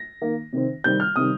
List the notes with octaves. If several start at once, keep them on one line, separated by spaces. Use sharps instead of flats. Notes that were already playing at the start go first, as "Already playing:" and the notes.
Already playing: A#6
D#3 A#3
C3 D#3 C4
C3 D#3 G3 C4 G6
F6
C3 D#3 G3 D#6